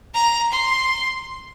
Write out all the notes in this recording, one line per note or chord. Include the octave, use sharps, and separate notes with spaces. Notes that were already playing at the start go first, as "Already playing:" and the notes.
A#5
C6